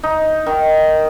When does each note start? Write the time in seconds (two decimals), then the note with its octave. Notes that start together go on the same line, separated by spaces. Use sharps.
0.03 D#4
0.46 D#3